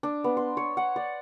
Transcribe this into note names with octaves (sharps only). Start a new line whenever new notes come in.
D4
B3
C6
C#5
F#5
D5